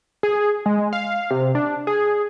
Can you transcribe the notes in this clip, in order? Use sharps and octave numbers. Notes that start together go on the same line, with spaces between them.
G#4
G#3
F5
C3
D4
G#4